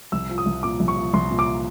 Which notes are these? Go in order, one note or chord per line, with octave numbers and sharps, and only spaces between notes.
C2 E6
F3
D#6
C2
A#2 D6
C2
C#6
F3
C2 C6
A#2
D6